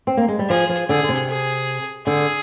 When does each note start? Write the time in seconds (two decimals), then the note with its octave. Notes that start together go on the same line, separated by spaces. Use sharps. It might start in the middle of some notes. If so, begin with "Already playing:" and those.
0.07 C4
0.17 A#3
0.28 G#3
0.39 G3
0.49 F3 G#4
0.69 F3
0.89 D3 G#4
1.03 D3
1.09 C3
1.29 G#4
2.07 D3 G#4